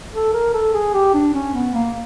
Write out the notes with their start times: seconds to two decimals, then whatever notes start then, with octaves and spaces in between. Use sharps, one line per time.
0.13 A4
0.33 A#4
0.53 A4
0.73 G#4
0.93 G4
1.14 D4
1.34 C#4
1.54 B3
1.74 A#3